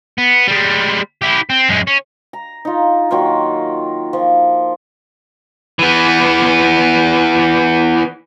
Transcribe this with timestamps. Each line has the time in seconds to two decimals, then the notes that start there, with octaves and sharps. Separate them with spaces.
0.18 B3
0.48 G3 G#3
1.22 E4 G4
1.50 C4
1.69 F#2 G#3
1.87 C#4
2.33 A#5
2.65 D#4 F4
3.11 D#3 F#3 A#3 F4
4.13 F3
5.79 E3 B3